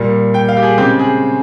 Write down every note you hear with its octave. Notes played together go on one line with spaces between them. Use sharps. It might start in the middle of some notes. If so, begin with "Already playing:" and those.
Already playing: A#2 G3 A#3
G5
F5
G4
G#4
C#3 G#3 C4 G4
G#4